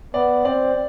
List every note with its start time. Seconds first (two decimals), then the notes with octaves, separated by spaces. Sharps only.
0.14 B3 D5
0.45 C4 D5